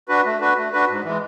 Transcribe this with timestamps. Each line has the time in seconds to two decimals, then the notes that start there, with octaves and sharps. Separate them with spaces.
0.08 D4 F#4 B4
0.25 A3
0.40 D4 F#4 B4
0.57 A3
0.72 D4 F#4 B4
0.88 G#2
1.04 E3 G#3